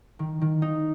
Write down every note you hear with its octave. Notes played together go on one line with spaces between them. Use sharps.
D#3
D#3
D#4